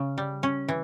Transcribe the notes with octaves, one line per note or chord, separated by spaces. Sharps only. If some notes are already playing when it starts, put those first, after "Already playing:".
Already playing: C#3
G3
C#4
E3